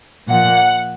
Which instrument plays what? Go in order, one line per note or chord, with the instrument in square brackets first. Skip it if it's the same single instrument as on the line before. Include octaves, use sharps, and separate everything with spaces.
[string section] A#2 F3 F#5